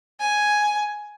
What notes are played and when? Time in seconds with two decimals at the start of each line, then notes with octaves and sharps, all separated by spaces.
0.20 G#5